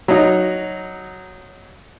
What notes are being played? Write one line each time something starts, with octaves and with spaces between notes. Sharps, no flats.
F#3 D#4